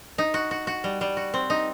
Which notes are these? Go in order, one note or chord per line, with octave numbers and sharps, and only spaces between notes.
D#4
F#4
F#4
F#4
G3
G3
F#4
C4
D#4